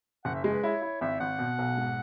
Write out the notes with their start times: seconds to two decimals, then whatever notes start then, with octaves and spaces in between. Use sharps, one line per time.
0.25 F#1 F#5
0.35 E5
0.44 G#3 D#5
0.53 B4
0.63 E4 C#5
0.82 E4
1.01 G#1 E5
1.20 G#1 F#5
1.38 B2
1.58 B1
1.77 G#2